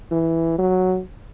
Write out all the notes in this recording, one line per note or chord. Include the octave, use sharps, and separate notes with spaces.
E3
F#3